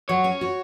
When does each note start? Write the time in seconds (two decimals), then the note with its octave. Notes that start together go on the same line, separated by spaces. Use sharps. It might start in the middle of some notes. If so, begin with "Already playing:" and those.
0.09 F#3 C#5
0.24 C#4
0.41 F#4